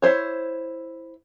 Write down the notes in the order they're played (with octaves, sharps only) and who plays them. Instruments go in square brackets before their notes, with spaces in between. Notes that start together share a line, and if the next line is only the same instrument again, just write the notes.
[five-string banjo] E4 C5 C#5